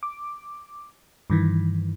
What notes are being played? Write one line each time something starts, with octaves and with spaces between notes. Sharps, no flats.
D6
G2 D#3 E3